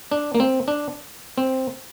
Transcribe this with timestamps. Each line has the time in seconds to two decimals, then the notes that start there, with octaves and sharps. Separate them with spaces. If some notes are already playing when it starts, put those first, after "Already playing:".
0.12 D4
0.35 A#3
0.40 C4
0.68 D4
1.38 C4